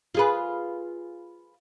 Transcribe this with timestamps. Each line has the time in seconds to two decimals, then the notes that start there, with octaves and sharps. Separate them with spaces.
0.14 F4 G#4 B4